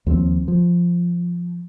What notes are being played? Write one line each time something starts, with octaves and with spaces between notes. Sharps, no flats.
D#2 F3 F#3 C4
F3